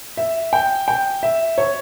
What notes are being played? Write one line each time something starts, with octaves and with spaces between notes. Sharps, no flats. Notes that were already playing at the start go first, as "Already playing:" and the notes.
E5
G5
G5
E5
C#5